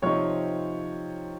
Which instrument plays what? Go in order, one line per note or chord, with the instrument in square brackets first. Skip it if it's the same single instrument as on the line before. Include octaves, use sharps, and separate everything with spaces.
[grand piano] C3 F3 C4 D#4 C#5